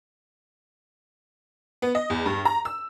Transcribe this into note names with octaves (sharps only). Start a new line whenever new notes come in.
B3
D#5
E2
G2
A#5
E6